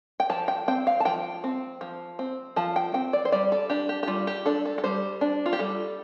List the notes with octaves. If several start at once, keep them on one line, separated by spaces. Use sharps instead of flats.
G5
F3 A5
G5
C4 G5
F5
A5
F3 G5
C4
F3
C4
F3 A5
G5
C4 G5
D5
C5
G3 D5
A4
D4 G4
G4
G4
G3 F4
G4
D4 A4
A4
A4
G3 C5
D4
F4
G4
G3 A4